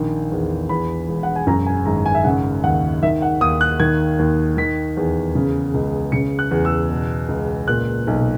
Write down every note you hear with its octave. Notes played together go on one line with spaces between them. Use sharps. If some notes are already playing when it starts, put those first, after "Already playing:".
Already playing: A#1 D#3
E2
E2 B5
E1
F#5
G#5
F#2 A#5
G#5
G#1 A#5
G#5
E5
C#3 F#5
D#2 F#5
D#3 E5
F#5
D#2 D#6
F#6
D#3 G#6
D#2
D#3 B6
E2
C#3
C#2
C#3 C#7
F#6
E2
E6
B2
C#2
A#2 F#6
B1